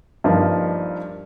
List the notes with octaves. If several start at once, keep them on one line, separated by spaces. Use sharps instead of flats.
G2 F3 A#3 D#4